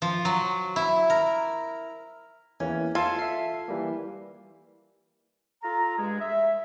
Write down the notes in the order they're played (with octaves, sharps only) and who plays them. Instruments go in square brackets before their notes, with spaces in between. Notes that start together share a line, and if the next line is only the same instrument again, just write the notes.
[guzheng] F3
F#3
E4
A#4
[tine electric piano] E2 E3 A#3 [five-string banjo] C#4
[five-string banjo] F4 A4 F5 [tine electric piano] A5 G#6
[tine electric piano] E5 C7
E3 G3 A#3
[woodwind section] F4 A4 A#5
G2 G#3 G#4
E5